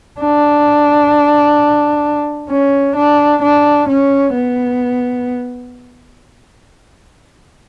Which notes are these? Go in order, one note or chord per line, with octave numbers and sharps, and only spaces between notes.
D4
C#4
D4
D4
C#4
B3